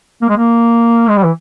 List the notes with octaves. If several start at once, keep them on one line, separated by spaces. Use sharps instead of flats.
A#3
G#3
A#3
G#3
G3
E3